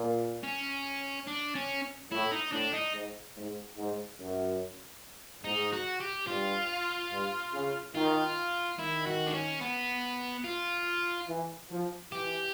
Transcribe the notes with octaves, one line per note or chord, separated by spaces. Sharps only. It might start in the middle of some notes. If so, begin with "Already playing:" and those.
Already playing: A#2
C#4
D4
C#4
A2 E4
D#4
A2 D4
D#4
G#2
G#2
G#2
F#2
G#2 D#4
F#4
G4
G2 F4
G2
C#3
D#3 F4
D#3 E4
F#4
D4
C#4
B3
F4
E3
F3
E3 G4